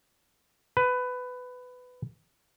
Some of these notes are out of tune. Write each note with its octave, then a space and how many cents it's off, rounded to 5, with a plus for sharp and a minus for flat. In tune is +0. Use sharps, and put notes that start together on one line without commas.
B4 +15